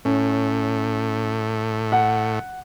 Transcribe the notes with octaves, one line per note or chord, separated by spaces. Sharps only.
A2 C#4
F#5